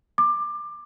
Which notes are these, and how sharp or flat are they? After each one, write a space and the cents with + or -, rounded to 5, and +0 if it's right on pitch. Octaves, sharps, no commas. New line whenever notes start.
D6 +20